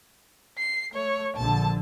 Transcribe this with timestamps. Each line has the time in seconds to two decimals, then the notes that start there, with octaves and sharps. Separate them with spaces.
0.58 C7
0.94 A3 C#5
1.36 A#1 D3 A5